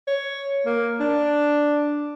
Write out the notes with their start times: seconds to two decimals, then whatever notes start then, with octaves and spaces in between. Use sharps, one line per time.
0.07 C#5
0.65 A#3
1.00 D4